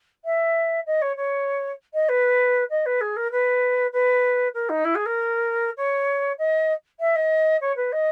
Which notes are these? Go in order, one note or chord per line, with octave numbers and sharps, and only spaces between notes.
E5
D#5
C#5
C#5
D#5
B4
D#5
B4
G#4
A#4
B4
B4
A#4
D#4
E4
G#4
A#4
C#5
D#5
E5
D#5
C#5
B4
D#5